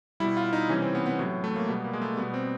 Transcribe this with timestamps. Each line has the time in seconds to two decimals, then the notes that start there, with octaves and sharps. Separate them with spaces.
0.20 B2 G3 E4
0.37 F4
0.53 D#4
0.69 C3 E3 G3 C#4
0.82 C4
0.95 B3
1.06 B3
1.19 A2 F#3
1.44 A3
1.56 A#3
1.68 B2 G3 B3
1.84 A#3
1.93 G#3
2.02 A3
2.17 B2 G3 B3
2.34 C4